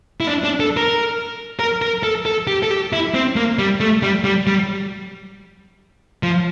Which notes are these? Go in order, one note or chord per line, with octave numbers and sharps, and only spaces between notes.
E4
D4
D4
A4
A#4
A#4
A#4
A4
A4
G4
A4
G4
E4
C4
A#3
G3
A3
G3
G3
G3
F3